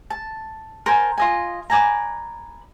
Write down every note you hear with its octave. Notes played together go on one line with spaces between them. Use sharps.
A5
A#4 C5 G#5 A5
F4 D#5 G#5
B4 D5 G#5 A#5